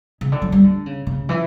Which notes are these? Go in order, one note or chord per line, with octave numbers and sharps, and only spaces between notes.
C#3
D3
F#3
G3
D3
C#3
C#3
E3